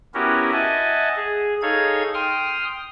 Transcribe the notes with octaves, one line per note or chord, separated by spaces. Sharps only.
B3 C#4 E4 F#4 G4 A#4
D#5 E5 F#5 G#5 A5
G#4
D#4 G#4 A4 C#5 F5 G#6
G5 C6 D#6 F6